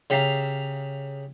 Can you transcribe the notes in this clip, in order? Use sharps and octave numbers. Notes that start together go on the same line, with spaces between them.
C#3 G4 E5 F5 A#5